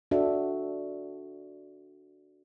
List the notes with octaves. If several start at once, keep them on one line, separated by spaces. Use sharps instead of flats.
D4 F#4 A4 E5